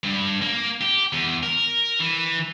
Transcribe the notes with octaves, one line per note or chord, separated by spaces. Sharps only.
G2
A#3
G4
E2
A#4
E3